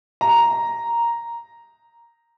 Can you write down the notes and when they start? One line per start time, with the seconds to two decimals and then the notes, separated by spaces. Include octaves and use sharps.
0.21 A#5